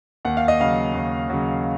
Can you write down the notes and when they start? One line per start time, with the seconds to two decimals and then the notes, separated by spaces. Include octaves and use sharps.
0.25 D#2 F#5
0.37 F5
0.48 D#5
0.60 C#3 F#3 F5
0.94 D#2
1.30 C#3 F#3